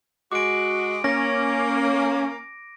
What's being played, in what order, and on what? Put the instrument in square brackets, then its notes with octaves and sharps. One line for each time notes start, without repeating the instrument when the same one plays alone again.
[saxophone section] G#3 F#4 [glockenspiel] D6 D7
[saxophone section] A#3 [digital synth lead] C#4 [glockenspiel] A#6